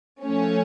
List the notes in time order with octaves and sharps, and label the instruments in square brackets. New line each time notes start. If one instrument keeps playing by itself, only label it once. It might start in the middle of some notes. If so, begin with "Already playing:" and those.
[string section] F3 A3 C#4